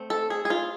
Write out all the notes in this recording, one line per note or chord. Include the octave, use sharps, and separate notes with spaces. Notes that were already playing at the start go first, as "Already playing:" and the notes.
Already playing: A3 C4
A4
G#4
G#4
F4